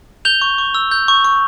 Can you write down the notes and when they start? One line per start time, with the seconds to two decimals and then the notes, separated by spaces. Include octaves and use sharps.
0.25 G6 F7 G7
0.42 C#6
0.58 C#6
0.75 E6
0.91 G6
1.08 C#6
1.24 C#6